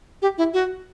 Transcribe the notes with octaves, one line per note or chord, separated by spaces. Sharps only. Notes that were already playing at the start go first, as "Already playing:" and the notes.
G4
E4
F#4